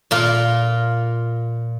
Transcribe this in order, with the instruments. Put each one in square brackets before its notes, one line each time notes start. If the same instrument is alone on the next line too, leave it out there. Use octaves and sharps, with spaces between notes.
[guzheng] A#2 F4 A#4